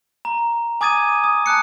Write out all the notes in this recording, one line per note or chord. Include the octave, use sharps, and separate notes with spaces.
A#5
G#5 D6 D#6 G#6 A6 D#7
D#6
A5 D#6 F#6 C#7